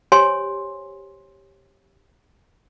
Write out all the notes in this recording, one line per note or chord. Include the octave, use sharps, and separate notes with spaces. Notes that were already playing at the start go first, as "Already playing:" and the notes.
G4 C5 C#5 G#5 C6